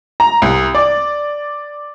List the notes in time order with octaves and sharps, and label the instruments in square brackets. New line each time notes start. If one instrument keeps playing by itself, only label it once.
[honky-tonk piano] A#5
C2
D5